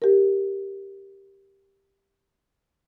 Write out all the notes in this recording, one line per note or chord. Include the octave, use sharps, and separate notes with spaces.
G4 A#4